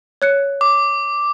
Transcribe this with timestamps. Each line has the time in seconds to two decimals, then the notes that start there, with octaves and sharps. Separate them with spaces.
0.22 C#5 F#6 C#7
0.61 D6